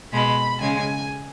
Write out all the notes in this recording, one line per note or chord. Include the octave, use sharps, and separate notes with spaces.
B2 G#3 B5
C#3 G#3 G#5